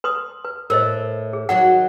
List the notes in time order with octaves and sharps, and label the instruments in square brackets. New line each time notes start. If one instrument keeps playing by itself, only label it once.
[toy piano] B4 C6 D#6
B4
[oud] A2 [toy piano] A#4 C5 D#5
[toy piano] G#4
[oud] D#3 F#3 F#4 [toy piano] F#5